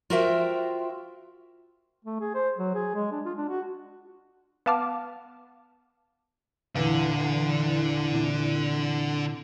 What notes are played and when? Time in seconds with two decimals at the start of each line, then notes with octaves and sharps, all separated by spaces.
0.10 F4 F#4 A#4 C5 E5 G5
2.05 A3
2.20 G#4
2.35 C5
2.57 F#3
2.75 G#4
2.95 G#3
3.12 D4
3.25 F4
3.38 D4
3.49 F#4
4.66 B3 F5 A5 D6 F6
6.75 E2 A#2 D3 E3 F5
8.12 A#2 C4 E4